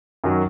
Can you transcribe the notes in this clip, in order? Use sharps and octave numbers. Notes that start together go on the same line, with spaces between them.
F#2 D#3 F#3